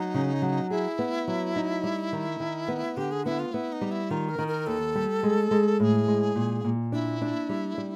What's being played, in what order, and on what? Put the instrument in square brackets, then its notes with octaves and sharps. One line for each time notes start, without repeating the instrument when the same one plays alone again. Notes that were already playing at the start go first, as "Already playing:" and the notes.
Already playing: [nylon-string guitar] F#3 [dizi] D#4
[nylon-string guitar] C#3
F#3
[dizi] E4 [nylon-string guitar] G#4
[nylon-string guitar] B3
F#3
D#4
G3
D#3
D#3
B3
[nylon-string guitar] D3 [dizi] G4
[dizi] G#4
[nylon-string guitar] B3 [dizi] E4
[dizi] F4
[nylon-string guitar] B3 [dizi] E4
[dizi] D#4
[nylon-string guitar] G3
[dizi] E4
[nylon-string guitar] D#3 [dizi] F4
[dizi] A#4
[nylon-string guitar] D#3
[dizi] A#4
[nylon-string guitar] D#2 [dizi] A4
[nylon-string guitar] G3
G#3
G#3
[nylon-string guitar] A2 [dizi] G#4 A4
[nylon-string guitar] G#3
A#2
A#2
[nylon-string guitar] D4 [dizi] E4
[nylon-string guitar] D4
G3
G3